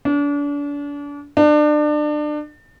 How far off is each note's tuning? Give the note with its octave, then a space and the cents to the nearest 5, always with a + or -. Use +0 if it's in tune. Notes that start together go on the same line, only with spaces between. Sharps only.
D4 -35
D4 +30